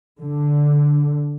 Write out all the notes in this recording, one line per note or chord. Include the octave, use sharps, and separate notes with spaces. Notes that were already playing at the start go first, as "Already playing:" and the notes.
D3